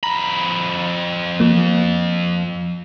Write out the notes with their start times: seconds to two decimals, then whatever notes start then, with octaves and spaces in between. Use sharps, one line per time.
0.03 F2 A#5 B5
1.40 F3 A#3